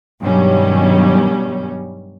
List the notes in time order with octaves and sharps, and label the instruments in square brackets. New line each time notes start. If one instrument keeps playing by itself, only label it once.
[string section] G2 B2 D#3 F#3 G3 C#4